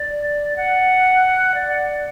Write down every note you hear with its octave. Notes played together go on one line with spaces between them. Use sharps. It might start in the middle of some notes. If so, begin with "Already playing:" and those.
Already playing: D5
F#5
D5